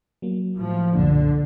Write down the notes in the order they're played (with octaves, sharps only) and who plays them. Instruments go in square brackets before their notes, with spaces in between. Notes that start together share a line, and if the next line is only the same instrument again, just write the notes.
[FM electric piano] F#3 A#3
[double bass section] A2 F3
[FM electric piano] C2 F#2 A#2 [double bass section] D3